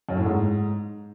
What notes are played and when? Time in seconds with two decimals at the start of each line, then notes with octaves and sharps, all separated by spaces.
0.09 F#2
0.17 A2
0.25 G#2